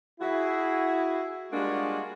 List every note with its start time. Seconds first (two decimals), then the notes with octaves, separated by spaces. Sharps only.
0.21 E4 F#4 G#4
1.53 G3 G#3 A#3 D4 F4 F#4